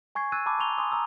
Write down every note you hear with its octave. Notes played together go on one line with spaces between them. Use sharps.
G#5 C#6 G#6 C7
E6 F#6 G#6 A6 D#7
A5 B5 D6 E6
A#5 C6 C#6 F7 G7
G#5 C6 D6 D#6
A#5 D#6 E6